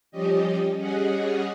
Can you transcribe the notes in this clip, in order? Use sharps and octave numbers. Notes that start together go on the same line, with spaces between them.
F3 G3 C#4 G4 D#5
G3 C#4 G#4 D#5 F#5